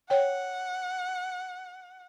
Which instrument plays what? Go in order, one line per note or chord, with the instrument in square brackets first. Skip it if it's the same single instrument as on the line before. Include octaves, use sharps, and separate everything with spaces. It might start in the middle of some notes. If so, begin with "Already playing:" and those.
[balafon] C#5 G5 [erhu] F#5